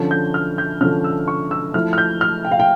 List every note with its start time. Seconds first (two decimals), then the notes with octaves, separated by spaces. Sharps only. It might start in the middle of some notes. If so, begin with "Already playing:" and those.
Already playing: D3 F3 C#4
0.11 G6
0.34 F6
0.58 G6
0.81 D3 F3 C#4 F6
1.04 E6
1.28 C#6
1.51 E6
1.74 F3 A3 E4 F6
1.93 F6
1.98 G6
2.21 F6
2.45 G5
2.52 F5
2.60 G5